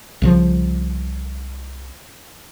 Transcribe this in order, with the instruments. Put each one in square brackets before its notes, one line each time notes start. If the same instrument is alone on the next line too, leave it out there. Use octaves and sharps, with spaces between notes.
[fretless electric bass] C2 C#3 F3